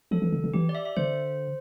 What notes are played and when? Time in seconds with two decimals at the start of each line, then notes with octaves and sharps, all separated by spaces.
0.11 F3 A4
0.22 E3
0.32 D3
0.44 D3
0.54 E3 G4
0.69 D5
0.75 E5
0.85 E5
0.97 D3 C5